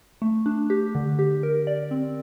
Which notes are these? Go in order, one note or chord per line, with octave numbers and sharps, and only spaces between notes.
A3
D4
G4
D3
G4
A#4
D5
C4